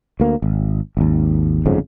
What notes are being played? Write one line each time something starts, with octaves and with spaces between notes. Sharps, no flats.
D2 A#3
G#1
G#1 D#2
G1 F2 G#2 C#3